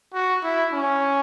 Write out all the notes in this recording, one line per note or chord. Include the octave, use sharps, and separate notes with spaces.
F#4
E4
C#4